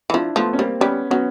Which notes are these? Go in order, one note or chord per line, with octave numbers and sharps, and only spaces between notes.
E3
F3 D4 E4
F3 A3 B3
C#4
G3 A#3 C4
G3 B3 C#4
F#3 B3 C#4